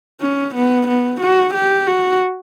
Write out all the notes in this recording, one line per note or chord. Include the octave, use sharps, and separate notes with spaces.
C#4
B3
B3
F#4
G4
F#4